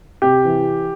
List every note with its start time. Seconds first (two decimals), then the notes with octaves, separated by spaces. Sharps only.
0.22 C3 G4
0.45 E3